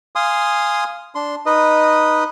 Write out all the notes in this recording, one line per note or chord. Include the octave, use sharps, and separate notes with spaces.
F5 G#5 C6 D#6
D4 C6
D#4 B4 D#5